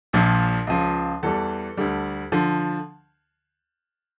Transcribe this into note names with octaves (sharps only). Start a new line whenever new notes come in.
A#1 A#2 F3
C#2 C#3 F3
E2 E3 G3 A4
D2 D3 G3
D3 F3